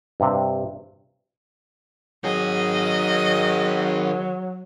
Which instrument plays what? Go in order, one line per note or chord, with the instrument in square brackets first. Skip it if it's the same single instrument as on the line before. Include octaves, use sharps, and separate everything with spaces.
[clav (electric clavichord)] G2 C3
[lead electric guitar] D#3 G#4 [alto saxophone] F#3 [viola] D#5